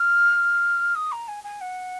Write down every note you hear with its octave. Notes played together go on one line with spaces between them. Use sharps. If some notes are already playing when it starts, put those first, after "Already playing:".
Already playing: F6
D#6
A#5
G#5
G#5
F#5